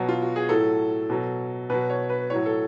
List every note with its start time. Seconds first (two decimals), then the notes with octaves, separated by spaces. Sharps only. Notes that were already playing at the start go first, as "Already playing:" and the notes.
Already playing: B2 F#3
0.09 F4
0.22 F#4
0.36 G#4
0.49 A2 F#3 A4
1.10 B2 F#3
1.70 B2 F#3 B4
1.90 C#5
2.09 B4
2.30 A2 F#3 C#5
2.46 A4